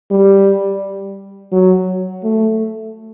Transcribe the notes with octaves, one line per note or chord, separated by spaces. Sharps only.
G3
F#3
A3